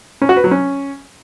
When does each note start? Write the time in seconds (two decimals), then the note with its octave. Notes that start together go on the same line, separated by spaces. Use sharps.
0.22 C#4
0.29 F#4
0.36 B4
0.44 F#3
0.51 C#4